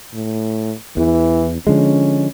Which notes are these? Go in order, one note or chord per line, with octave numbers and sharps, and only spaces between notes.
A2
E2 E3
D3 F3 G#3 C#4